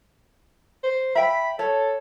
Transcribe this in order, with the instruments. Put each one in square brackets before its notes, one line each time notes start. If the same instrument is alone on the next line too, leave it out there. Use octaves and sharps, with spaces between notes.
[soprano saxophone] C5
[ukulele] E5 G5 [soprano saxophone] B5
[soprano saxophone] A4 [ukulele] C#5